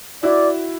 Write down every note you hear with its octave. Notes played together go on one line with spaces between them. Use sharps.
E4 F#4 D5